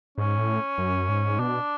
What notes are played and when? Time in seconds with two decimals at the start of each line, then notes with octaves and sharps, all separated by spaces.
0.18 G#2 C#4
0.38 A2
0.78 F#2
1.09 G#2
1.39 B2 D4